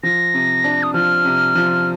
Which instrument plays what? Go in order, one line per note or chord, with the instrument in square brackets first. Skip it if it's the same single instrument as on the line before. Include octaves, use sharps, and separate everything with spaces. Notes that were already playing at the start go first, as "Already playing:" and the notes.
[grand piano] F3 [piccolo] A#6
[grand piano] C3
D4
[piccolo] D#6
[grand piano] F3 [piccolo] F6
[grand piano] C3
F3